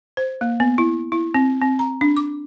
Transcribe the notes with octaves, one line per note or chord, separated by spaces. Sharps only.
C5
A#3
B3
E4
E4
C4
C4
A#5
D4
D6